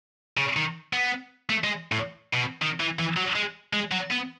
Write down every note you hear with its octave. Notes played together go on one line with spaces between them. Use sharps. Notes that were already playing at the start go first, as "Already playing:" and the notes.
C#3
D#3
B3
A3
G#3
A2
B2
D#3
E3
E3
F#3
G#3
G#3
F#3
B3